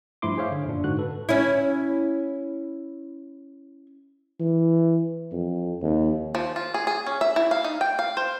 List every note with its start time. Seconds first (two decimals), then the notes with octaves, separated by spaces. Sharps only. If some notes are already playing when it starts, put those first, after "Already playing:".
0.22 G2 F3 A3 E4 C6 D6
0.37 G#4 C5 C#5 E5 F5
0.51 D3
0.66 F#2 A#2 D4
0.84 G#2 D3 F#4 F#6
0.99 A4 B4
1.29 C#4 E4
4.40 E3
5.32 F2
5.82 D#2
6.35 F3
6.56 F4
6.74 G#4
6.87 G#4
7.06 C#4
7.21 E5
7.36 E4
7.51 F5
7.64 D#4
7.81 G5
7.99 F5
8.17 C5